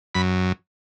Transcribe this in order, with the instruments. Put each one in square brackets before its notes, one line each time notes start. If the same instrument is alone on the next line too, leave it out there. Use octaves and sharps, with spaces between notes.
[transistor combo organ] F#2 B5